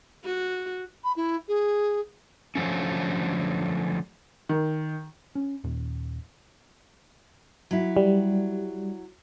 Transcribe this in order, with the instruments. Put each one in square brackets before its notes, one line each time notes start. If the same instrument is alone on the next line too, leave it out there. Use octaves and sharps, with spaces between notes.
[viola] F#4
[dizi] B5
E4
G#4
[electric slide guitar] D3 F3 F#3 A3 C#4
[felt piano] D#3
[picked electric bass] C#4
D#2 A#2
[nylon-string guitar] F#3 E4
[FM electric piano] G3